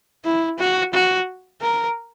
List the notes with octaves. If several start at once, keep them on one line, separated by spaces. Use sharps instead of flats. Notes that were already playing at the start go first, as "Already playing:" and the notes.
E4
F#4
F#4
A#4